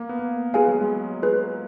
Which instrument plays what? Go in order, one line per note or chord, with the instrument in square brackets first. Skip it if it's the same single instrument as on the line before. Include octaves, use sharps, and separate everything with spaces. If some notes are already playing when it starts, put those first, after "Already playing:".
Already playing: [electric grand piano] A#3
B3
A#3
[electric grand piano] G#3 [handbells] F4 G#4 B4 F5 G#5
[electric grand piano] F#3
G#3
[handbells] F4 G#4 B4